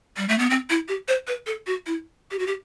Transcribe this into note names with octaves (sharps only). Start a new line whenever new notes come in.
G3
A3
B3
C4
E4
G4
C5
B4
A4
F#4
E4
G4
F#4
G4